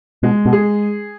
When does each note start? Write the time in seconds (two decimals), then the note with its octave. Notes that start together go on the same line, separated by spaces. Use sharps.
0.23 B2 G#3
0.46 B2
0.53 G#4